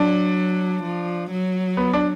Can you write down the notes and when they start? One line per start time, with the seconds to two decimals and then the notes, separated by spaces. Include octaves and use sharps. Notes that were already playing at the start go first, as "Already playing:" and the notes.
Already playing: F#3 D4
0.83 F3
1.30 F#3
1.77 B3
1.93 D4